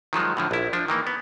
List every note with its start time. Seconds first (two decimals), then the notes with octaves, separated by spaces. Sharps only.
0.13 D#3 F3 F#3 G#3
0.37 A2 D3 F3
0.51 A#1 E4
0.73 F3 D4
0.88 D#3 E3 A#3
1.07 B3